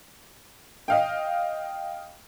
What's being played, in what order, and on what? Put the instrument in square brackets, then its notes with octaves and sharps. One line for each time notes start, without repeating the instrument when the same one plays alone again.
[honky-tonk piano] D#5 F5 G5